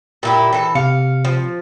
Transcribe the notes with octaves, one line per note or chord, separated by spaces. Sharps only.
A#2 E4 G4
E3 A4
C3 F5 C#7
F3